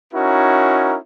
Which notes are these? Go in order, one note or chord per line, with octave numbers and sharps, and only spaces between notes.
C#4 D#4 E4 F#4 A#4